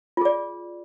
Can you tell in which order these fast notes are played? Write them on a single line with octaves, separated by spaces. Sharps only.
F4 G#4 D5